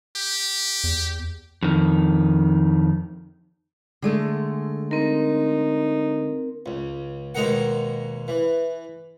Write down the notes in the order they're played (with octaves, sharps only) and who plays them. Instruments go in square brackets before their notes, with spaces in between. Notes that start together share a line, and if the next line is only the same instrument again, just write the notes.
[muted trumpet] G4
[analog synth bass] E2
[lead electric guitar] F2 D#3
[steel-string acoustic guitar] D3 G#3 A3
[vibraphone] C4 A#4 [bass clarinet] D#4
[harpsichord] C#2
D#2 B2 G#3 D#4 A#4 F#5
E3